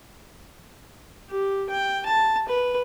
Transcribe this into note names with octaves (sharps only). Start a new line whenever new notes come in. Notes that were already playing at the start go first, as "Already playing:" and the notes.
G4
G5
A5
B4